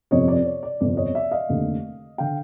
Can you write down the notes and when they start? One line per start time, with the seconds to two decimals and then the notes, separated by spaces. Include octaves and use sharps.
0.11 G1 F2 C3 F3 C#5 D#5
0.28 D5
0.45 C#5
0.63 D5
0.81 G1 F2 C3 F3 D5
0.97 C#5 D#5
1.15 D5 E5
1.31 D#5 F5
1.49 F1 D#2 D3
2.18 D3 F5 G5